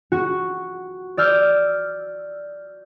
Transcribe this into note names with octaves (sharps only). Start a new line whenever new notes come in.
F#4
D5 E6 F6 G6